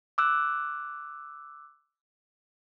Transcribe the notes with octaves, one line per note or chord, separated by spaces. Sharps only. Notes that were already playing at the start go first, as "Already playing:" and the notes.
D6 E6 F#6